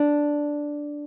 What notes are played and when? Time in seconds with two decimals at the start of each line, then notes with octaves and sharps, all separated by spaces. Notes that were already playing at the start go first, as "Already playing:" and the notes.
Already playing: D4